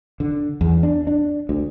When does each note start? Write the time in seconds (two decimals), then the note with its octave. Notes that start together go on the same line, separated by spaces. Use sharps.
0.20 D3
0.61 E2
0.83 D4
1.07 D4
1.49 D2